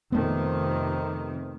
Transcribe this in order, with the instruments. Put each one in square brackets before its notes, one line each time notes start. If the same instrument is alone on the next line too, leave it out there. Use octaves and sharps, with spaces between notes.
[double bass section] F2 C3 D#3 [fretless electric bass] A3 B3